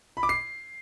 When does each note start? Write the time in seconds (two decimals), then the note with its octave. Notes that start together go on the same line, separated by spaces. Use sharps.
0.17 B5
0.23 D6
0.29 C7